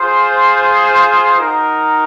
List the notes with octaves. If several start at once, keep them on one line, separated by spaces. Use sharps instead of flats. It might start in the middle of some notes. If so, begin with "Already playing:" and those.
Already playing: F4 G#4 C5
D#4 F#4 A#4